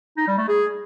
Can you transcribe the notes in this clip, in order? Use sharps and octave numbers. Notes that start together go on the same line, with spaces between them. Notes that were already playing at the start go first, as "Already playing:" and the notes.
D#4
G3
A3
G#4